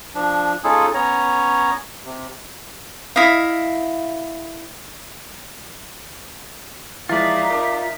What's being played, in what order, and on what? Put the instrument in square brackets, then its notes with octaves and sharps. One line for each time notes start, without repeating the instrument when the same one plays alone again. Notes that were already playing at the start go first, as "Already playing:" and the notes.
[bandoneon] F3 D4
G#3 C#4 D#4 F4 G#4 A4
B3 C#4 C#5 A#5
C3
[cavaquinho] E4 D#5 F5
[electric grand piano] E3 F3 G#3 [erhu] D#4 [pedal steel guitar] F4 D5 [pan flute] E5
[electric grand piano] A#4 D6